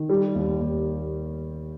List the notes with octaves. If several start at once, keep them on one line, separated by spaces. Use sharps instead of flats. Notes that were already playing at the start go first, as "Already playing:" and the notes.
Already playing: D#3
G3
D#2
D#2